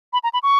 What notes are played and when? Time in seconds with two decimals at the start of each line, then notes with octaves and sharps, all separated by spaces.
0.13 B5
0.24 A#5
0.33 B5
0.43 C#6